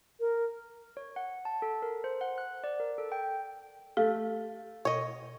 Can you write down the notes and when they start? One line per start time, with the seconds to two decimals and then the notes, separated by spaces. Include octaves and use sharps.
0.20 A#4
0.97 C#5
1.16 F#5
1.45 A5
1.62 A4
1.82 A#4
2.04 C5
2.21 F#5
2.38 F#6
2.64 D5
2.80 A#4
2.98 A4
3.12 G5
3.97 A3 G4 F5
4.85 B2 C#5 D#5